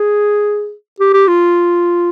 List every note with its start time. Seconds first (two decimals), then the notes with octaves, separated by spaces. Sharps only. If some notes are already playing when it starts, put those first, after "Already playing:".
Already playing: G#4
1.00 G4
1.13 G4
1.28 F4